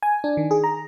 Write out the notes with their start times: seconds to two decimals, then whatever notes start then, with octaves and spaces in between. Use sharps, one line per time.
0.03 G#5
0.24 D4
0.37 D#3
0.51 G#4
0.64 A#5